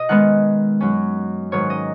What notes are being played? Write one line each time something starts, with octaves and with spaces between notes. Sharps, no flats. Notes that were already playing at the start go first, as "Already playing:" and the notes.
Already playing: B2 D#5
D#3 G#3 B3 D#4 F#5
F#2 F#3 C#4
G#2 D#3 F#3 B3 C#5
D#5